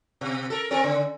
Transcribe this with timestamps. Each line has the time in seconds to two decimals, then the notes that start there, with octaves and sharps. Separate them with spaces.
0.21 B2
0.50 A4 A#4
0.71 C4 A4 A#4
0.84 C#3